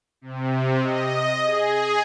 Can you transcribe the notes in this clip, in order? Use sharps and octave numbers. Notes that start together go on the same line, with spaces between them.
C3
D#5
G#4